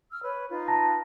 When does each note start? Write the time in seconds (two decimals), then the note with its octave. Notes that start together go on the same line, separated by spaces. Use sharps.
0.11 E6 F6
0.24 B4 C#5
0.50 D#4 F4 B4
0.68 A5 A#5 A#6